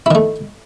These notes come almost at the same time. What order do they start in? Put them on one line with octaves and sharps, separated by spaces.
E4 D#3 A3